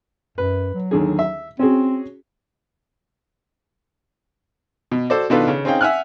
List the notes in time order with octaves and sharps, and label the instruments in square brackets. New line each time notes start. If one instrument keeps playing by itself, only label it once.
[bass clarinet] F#2 [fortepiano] B4
[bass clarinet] F#3
[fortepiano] D#2 D3 G#4
E5
[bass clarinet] C4 [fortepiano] C#4 F#4 G#4
[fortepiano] B2
F#4 A4 C5 D5
B2 D#3 D4 F4 A4 B4
C#3
C4 C#4 D#4 G#4 F5 G5
E5 F#5 G#5 F6 F#6